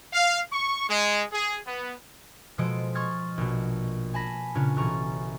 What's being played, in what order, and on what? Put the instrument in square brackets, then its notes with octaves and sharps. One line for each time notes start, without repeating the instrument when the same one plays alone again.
[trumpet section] F5
C#6
G#3
G#4
B3
[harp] B2 F3 G#3 A4 D#6 D7
C6 C#6 D#6 F6 G#6 A6
A#1 B2
G#5 A5 B5 A#6
A#2 C#3 C#4 D4
A1 B2 A#5 C#6 A6